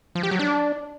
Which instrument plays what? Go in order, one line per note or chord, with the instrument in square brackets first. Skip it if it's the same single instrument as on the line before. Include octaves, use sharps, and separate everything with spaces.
[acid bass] F3
G4
F#3
D4